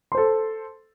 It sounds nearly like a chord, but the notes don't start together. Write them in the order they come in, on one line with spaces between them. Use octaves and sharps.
C6 C5 A4